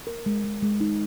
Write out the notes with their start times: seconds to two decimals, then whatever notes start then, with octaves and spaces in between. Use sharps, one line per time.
0.07 A#4
0.26 G#3
0.44 G#3
0.62 G#3
0.81 D#4